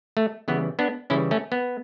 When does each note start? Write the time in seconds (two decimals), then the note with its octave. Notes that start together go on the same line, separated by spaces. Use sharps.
0.17 A3
0.48 C#3 E3 G3 B3
0.79 B3 D4
1.10 C#3 E3 G3 C#4 E4
1.31 A3 C#4
1.52 B3